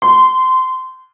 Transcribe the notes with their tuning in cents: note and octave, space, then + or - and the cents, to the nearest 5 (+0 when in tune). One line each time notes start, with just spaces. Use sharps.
C6 -20